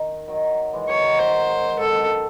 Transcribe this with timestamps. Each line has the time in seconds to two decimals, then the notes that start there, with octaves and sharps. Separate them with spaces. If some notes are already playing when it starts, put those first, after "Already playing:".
Already playing: D#3
0.28 D#3 F#3
0.73 E3 G#3
0.89 D#3 F#3 C#5
1.04 D#3 F#3
1.19 D#3 F#3 C5
1.50 G#2
1.79 G#2 A4
1.94 F#2